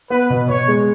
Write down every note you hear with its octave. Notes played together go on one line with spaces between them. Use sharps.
B3 B4
B2
B2 C#5
G#3